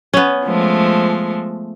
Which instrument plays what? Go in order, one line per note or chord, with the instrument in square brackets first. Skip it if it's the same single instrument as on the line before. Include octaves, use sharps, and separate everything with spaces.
[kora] B3 C#4
[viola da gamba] F3 G#3 A3